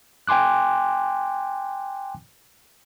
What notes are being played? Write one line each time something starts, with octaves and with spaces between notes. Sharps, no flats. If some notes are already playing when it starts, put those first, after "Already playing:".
G5 G#5 C6 D6 F#6